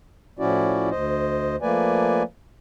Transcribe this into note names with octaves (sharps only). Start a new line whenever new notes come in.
A2 F3 C#4 E4 F#4 D5
D2 C5 D#5
F3 A3 A#3 B4 D5 G#5